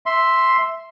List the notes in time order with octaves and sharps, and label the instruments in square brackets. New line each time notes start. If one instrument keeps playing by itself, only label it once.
[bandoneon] E5 C6